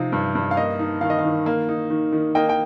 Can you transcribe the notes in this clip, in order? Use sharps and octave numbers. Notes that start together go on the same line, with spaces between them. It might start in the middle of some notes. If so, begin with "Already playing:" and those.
Already playing: C3 F3 D#4 F5
G2
G2
F5
A#3 D#5
D#4
D#3 F5
D#5
F5
D#3
A#3
D#4
D#3
D#3
A#3 D#5 G5
G5